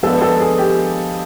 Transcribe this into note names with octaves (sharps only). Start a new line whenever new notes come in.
F3 G#3 B3 D4 A4
A4
G#4
G4